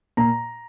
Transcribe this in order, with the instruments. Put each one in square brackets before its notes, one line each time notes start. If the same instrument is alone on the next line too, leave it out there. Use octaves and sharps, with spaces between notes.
[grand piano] A#2 A#5